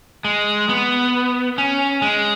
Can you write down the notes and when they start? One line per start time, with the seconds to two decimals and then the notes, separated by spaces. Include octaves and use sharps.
0.25 G#3
0.69 B3
1.58 C#4
2.02 G#3